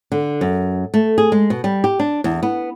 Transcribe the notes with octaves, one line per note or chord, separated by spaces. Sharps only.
D3
F#2
A3
G#4
G#3
B2
G3
G4
D4
E2
B3